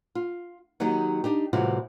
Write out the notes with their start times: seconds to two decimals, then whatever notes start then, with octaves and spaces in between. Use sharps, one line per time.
0.15 F4
0.80 D#3 F#3 A#3 D#4 G4
1.24 D4 D#4 G4
1.53 A2 C3 E3 G3 F4 F#4